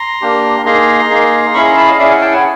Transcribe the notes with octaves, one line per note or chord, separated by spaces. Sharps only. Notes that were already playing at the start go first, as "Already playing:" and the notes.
Already playing: A#5 C6
A#3 D4 G4
A#3 D#4 G#4 A#5 C6
A#3 D#4 G#4
C#4 E4 G#4 B5 C#6
A#5 C6
A5 B5
D#5 F5
C#4 E4 G#4 D5 E5
F#5 G#5
G5 A5
F#5 G#5